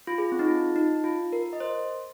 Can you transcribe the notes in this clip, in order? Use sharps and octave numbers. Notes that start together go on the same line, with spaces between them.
F4
G#4
C4
D#4
F4
D#4
F4
A#4
D#5
C5